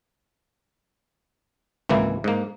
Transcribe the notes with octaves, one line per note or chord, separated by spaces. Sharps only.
G#1 C#2 E3 A#3 E4
G#2 A#3